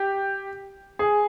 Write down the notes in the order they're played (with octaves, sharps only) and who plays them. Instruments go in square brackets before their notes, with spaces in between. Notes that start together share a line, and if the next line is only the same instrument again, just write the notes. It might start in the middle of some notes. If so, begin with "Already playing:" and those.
Already playing: [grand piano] G4
G#4